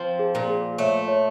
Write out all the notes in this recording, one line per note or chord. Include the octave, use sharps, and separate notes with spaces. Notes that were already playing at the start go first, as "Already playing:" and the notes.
Already playing: F3 C4
G#4
A#2
G#4
A3 C#5
C#5